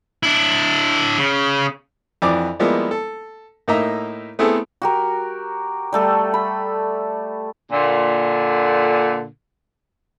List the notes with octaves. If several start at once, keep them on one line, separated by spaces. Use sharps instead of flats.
D4 E4
C#3
F2 E3 D5 D6
F3 G3 G#3 A#3 B3 E4
A4
A2 A#3 D#4 D#5 E5 A#5
A3 B3 C4 E4 G#4 A4
F#4 G4 A#4
G3 A3 A4
B5
A#2 D3